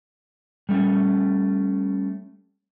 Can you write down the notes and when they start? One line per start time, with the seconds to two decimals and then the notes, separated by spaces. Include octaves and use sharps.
0.69 G3 A3 C#4